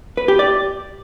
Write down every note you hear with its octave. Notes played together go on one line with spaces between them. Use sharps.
B4
G4
D5